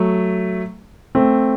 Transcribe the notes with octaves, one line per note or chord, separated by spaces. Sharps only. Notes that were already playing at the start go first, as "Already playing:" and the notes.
Already playing: F#3 A3
A3 C4